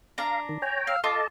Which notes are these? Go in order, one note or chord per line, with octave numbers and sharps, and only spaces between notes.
D4 F5 A#5
D#3
C#5 G5 G#5 A#5
F5 E6
F4 A4 D#5 A5 D6